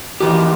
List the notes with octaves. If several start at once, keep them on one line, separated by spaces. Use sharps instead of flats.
F2 E3 G4